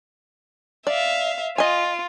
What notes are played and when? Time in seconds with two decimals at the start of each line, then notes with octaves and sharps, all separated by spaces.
0.87 D5 E5 F5
1.58 F4 D#5 G#5